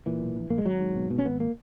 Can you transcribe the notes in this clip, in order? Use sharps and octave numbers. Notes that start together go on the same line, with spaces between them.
A#2 E3
B1
A#1
A#1 A#3
G#3
G#1 F#3
G#2
B2
B2
C#4
G#1 B3
A#3